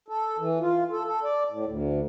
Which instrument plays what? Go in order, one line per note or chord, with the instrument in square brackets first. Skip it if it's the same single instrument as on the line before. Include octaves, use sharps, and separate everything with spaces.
[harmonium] A4
E3
F4
A4
A4
D5
A2
D2